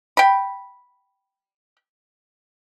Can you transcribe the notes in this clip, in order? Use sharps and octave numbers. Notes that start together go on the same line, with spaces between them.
G5 B5